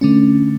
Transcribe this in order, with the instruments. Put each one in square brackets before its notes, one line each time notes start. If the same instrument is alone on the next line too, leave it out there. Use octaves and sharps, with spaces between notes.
[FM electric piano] D3 A3 C#4